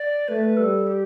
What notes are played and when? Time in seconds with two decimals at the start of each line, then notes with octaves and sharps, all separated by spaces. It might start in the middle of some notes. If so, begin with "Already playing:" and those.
Already playing: D5
0.28 A3 B4
0.56 G3 A4
0.86 G4